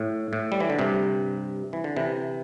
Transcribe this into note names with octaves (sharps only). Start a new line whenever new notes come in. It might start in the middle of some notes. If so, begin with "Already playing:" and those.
Already playing: A2
A2
G3
E3
D3
G2 C3
E3
D3
C3 E3